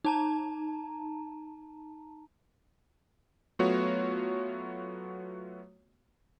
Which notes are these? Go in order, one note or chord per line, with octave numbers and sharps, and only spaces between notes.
D#4 A5 A#5
F#3 A3 B3 F4 F#4 C#5